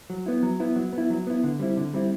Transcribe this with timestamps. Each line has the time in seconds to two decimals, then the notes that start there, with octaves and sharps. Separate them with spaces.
0.10 F#3
0.26 B3 E4
0.43 F#3
0.60 B3 E4
0.76 F#3
0.93 B3
0.98 E4
1.10 F#3
1.27 B3 E4
1.44 D3
1.59 G3 C4 E4
1.77 D3
1.94 G3 C4 E4